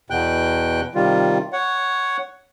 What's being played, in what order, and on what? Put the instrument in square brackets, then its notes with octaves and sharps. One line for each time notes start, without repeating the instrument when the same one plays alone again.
[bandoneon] E2 B2 G5 F#6
C3 D#3 G3 F4
C#5 F#5